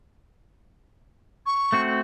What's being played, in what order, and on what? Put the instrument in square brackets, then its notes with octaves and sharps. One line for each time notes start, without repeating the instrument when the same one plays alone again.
[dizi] C#6
[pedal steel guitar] A3 C4 F#4